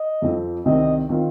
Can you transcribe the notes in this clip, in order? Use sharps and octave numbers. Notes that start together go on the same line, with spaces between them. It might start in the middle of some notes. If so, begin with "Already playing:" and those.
Already playing: D#5
F2 F3 C4
C2 C3 D#3 C4 D#5
D#3 C4 F4